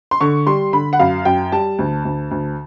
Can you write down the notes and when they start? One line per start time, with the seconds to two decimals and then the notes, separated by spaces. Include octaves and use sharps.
0.11 C6
0.21 D3 C#6
0.47 G3 C6
0.73 D3 B5
0.93 F#5
0.99 F#2 F5
1.25 F#2 G5
1.52 G3 A5
1.79 D2
2.05 D2
2.31 D2